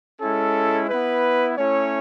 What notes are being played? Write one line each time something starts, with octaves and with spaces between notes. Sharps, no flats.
G#3 C#4 E4 A4
B3 E4 B4
A3 C#4 E4 C#5